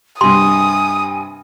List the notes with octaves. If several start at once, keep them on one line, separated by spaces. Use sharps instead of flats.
G2 C3 G#5 C6 D#6